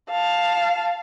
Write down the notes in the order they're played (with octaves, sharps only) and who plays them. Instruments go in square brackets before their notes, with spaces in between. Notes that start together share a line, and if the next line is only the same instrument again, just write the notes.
[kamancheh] F5 A5